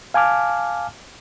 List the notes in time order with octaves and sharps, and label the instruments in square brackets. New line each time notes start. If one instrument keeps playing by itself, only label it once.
[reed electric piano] F5 G#5 A5 D6 F6